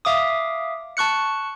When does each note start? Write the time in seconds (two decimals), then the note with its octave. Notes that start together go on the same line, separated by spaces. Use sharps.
0.05 E5 F5 D6 D#6
0.97 A5 C#6 F#6 C#7